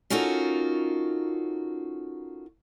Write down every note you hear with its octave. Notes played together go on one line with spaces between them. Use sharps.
C#4 D#4 F4 F#4 A4 A#4